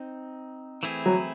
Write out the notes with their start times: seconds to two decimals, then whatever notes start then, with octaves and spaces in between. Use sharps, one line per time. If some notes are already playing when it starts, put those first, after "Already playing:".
Already playing: C4 D#4
0.83 E3 A3 C4 E4 G#4
1.06 F#3